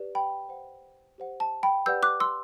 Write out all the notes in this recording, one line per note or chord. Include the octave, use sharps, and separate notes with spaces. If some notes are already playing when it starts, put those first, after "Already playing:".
Already playing: G4 B4 D5
G5 B5
C5 F#5
G4 C5 F#5
A5
G5 B5
G4 B4 D5 F#5 E6 G6
D6 F#6
C6 E6